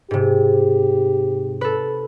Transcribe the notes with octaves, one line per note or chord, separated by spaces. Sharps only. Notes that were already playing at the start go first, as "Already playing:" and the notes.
G#2 C3 G4
A4 B4